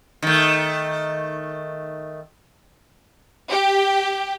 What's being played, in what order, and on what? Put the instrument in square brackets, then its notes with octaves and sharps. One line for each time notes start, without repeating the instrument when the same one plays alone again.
[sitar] D#3 A3
[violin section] G4